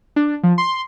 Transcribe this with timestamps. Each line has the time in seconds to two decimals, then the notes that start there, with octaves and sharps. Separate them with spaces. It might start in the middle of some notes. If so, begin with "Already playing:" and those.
0.16 D4
0.43 F3
0.58 C6